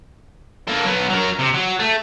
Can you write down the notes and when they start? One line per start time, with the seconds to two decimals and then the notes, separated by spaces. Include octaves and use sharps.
0.68 A#3 A4
0.84 F#3 B3
1.10 F#3 A#4
1.39 C3
1.54 F#3
1.79 A3